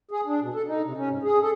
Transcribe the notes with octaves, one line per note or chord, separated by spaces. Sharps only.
G#4
D4
B2
A4
D#4
C3
C#4
G#2
G#4
A4